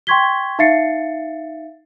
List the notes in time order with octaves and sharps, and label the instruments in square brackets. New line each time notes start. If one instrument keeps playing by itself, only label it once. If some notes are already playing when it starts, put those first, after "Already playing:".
[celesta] G5 C6 C#6 G#6 B6 G7
D#4 E5 F5 A6 C7 C#7